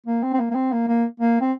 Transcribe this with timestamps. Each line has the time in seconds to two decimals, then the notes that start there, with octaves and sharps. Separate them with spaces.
0.06 A#3
0.23 C4
0.33 C4
0.39 A#3
0.51 A#3
0.55 C4
0.72 A#3
0.88 A#3
1.20 A#3
1.41 C4